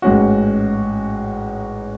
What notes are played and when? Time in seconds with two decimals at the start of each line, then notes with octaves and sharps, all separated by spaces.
0.02 A1 G#2 G#3 C#4 F#4